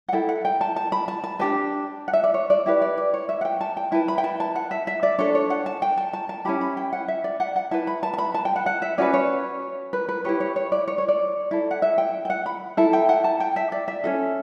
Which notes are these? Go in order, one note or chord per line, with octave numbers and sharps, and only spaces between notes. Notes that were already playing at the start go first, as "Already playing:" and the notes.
F#5
E4 A4 G5
F#5
G5
A5
A5
B5
A5
A5
D4 G4 B4 A5
F#5
E5
D5
C#5
D5
E4 G4 B4 E5
D5
D5
C#5
E5
F#5
G5
A5
G5
E4 B4 A5
B5
G5
A5
A5
F#5
E5
E5
D5
D4 A4 C#5
C#5
F#5
A5
G5
A5
A5
A5
C#4 E4 G4 B5
B5
G5
F#5
E5
D5
F#5
F#5
E4 B4 A5
B5
A5
A5
B5
A5
G5
F#5
F#5
E5
C#4 F#4 B4 D5
C#5
B4
B4
E4 G4 B4 C#5
C#5
C#5
D5
C#5
C#5
D5
E4 A4
F#5
E5
G5
G5
F#5
B5
E4 A4 A5
G5
F#5
A5
G5
E5
D5
E5
C#4 F#4 A4